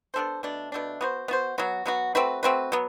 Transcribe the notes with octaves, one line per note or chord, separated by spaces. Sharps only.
B3 D4 A4 C5
B2 A3 D4
B2 A3 D4
B3 F#4 C5
B3 F#4 C5
F#3 B3 F#4
F#3 B3 F#4
A3 C4 F#4 B4
A3 C4 F#4 B4
F#3 B3